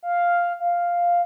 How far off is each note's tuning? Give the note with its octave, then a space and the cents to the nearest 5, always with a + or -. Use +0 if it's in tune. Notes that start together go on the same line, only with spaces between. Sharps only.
F5 +0
F5 +0